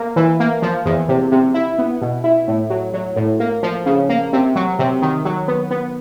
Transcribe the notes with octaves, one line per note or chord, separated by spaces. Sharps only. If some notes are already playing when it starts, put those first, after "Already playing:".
Already playing: A#3
E3
A#3
F3
E2
C3
C3
E4
B3
B2
E4
A2
F#3
F#3
A2
A#3
F3
C#3
A#3
C3
F#3
C3
D#3
F#3
B3
B3